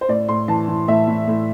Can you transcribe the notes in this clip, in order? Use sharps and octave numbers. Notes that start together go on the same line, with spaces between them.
C5
A2 D5
A2 C6
E3 A5
E3
A2 E5
A2
A2